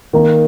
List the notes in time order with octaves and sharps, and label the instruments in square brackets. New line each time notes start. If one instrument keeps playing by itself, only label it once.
[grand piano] D#3 A#3 D#4